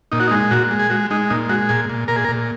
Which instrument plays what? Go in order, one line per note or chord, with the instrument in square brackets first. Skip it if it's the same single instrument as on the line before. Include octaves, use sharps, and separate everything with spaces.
[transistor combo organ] A#2 D#4
F#4
D#4
G#3
A#2 F#4
G#3
G#4
G#3 F#4
G#3 D#4
A#2 D#4
G#3 F#4
A#2 G#4
A#2
A#2 A#4
G#4
A#4
A#2